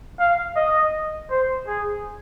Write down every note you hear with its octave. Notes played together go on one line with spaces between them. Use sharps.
F5
D#5
C5
G#4